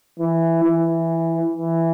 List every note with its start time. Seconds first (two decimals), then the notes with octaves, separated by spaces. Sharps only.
0.19 E3
0.63 E3
1.51 E3